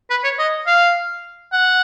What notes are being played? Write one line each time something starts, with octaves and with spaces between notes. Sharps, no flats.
B4
C#5
D#5
F5
F#5